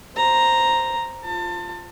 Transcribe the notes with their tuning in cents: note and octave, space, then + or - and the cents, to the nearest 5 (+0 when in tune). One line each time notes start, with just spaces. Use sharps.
C5 +0 A#5 +0
F4 +0 A5 +30